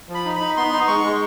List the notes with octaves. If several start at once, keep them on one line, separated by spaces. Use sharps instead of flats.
F3
B5
D#4
D#4 B5
B3 C6
D#4
G#3 C#6
G#3